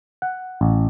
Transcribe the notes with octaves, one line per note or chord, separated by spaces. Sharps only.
F#5
A1